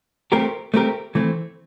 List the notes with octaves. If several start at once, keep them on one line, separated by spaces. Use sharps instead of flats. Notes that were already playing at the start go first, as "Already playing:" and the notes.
A3 C4 G4 A#4
A3 C4 G4 A#4
E3 A3 C4